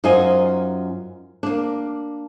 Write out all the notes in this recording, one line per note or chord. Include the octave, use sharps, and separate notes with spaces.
F#2 D#4 F4 C5 D#5 G#5
A#3 D4